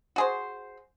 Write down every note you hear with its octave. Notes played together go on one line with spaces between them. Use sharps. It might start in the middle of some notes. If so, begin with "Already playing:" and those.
F#4 G#4 C5